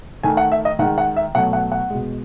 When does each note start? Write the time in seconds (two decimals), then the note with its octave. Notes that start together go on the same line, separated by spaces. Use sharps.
0.23 D#3 A3 G#5
0.37 F#5
0.52 E5
0.65 D#5
0.79 D#3 F#5
0.82 G#3
0.98 F#5
1.16 E5
1.35 B2 F#3 A3 F#5
1.53 F#5
1.72 F#5
1.90 B2 G#3